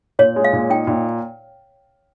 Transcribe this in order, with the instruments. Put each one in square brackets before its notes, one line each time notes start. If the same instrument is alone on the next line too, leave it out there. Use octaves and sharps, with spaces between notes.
[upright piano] A#2 [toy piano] C#5
[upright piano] G#3
[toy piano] F5
[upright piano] A#2
[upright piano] D#4 [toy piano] G5
[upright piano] A#2